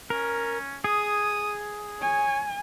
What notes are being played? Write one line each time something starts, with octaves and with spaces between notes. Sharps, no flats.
C#4 A#4
G#4 D#6
C#5 G#5